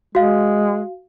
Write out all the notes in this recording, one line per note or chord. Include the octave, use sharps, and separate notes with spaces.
G#3 F#4 F5